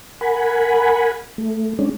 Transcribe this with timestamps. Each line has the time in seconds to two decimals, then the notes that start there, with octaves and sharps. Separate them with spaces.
0.21 A#4 F#5 G#5 B5
1.38 A3
1.79 G#3 C#4 D4